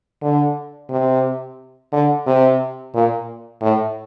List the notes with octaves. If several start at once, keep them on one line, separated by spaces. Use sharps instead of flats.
D3
C3
D3
C3
A#2
A2